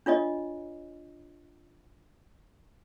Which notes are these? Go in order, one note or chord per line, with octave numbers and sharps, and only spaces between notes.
D4 F4 C#5 D#5